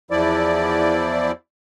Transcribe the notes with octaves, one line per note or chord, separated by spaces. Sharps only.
E2 F3 E4 D5